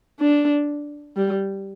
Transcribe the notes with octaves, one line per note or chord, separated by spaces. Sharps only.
D4
G3